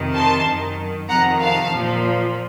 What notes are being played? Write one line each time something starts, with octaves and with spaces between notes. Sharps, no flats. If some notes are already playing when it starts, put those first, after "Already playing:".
Already playing: F2 C3 D#3
A5 C6
F#2 D#3
F2 C3 D#3 F#5 A#5
F5 A5
A#2 F3